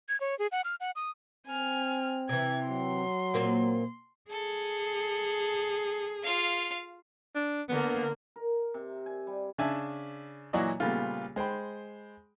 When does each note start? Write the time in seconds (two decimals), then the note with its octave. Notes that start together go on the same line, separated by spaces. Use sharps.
0.09 G#6
0.20 C#5
0.39 G#4
0.52 F#5
0.64 F6
0.80 F#5
0.96 D#6
1.47 C4 G#5 F6
2.29 C3 E3 G#6
2.67 F#3 C6
3.34 A#2 A#3 C4
4.30 G#4 A4
6.22 F4 F5
7.36 D4
7.69 D3 A#3 B3
8.36 A#4
8.74 C3
9.06 G#5
9.27 G3
9.58 C#3 D4 E5 G#5 A5
10.53 A#2 E3 F#3 F#4 D5 D#5
10.80 A#2 C#3 G3 A3 B3 F4
11.36 G#3 C5 G5 B5